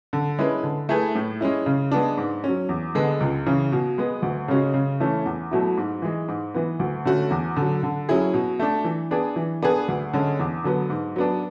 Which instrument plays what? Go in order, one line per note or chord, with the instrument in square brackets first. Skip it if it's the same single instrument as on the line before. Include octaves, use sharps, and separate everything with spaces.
[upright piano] D3
G#3 C#4 E4 B4
D3
A3 E4 G#4 B4
A2
G#3 C#4 E4
C#3
G#3 B3 D4
G#2
F#3 C#4
E2
D3 G#3 B3
C#2
C#3 E3
B2
G#3 B3
D2
C#3 G#3 C#4 F#4
C#3
E3 A3 C#4 E4
E2
B2 F#3 A3 E4
G#2
E3 G#3
G#2
E3 B3
D2
D3 A3 C#4 F#4
E2
D3 F#3
D3
F#3 C#4 E4 G#4
B2
A3 D4
E3
B3 D4 G#4
E3
B3 D4 G#4 B4
D2
D3 G#3 C#4
E2
D3 F#3 B3
G#2
F#3 B3 D4